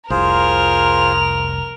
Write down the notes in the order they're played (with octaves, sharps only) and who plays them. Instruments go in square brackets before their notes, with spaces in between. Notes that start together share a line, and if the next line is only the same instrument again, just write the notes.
[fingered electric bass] F1 C2 [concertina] F4 G#4 C5 [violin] A#4 F7